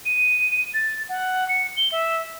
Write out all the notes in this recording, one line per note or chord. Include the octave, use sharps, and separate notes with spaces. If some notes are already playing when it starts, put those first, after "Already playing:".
D#7
A6
F#5
C#7
G7
E5